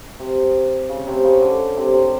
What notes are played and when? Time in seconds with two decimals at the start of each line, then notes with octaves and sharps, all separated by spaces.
0.19 C3
0.89 C#3
1.07 C3
1.24 C#3
1.41 D3
1.77 C3
1.93 C3